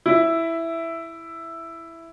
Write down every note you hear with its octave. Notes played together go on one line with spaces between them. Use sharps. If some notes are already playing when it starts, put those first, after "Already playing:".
E4 E5